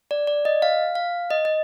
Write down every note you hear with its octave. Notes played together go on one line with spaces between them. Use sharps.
D5
D5
D#5
F5
F5
D#5
D#5